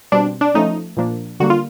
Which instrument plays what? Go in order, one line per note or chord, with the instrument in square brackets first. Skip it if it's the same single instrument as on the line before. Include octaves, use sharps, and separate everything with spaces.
[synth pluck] B2 G3 C4 [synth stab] D4
[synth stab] D4
[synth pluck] F3 A3 C#4 [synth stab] D#4
[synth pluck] A#2 F3 A#3 D4
[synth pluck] D3 G3 A#3 [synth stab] F#4
[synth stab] F4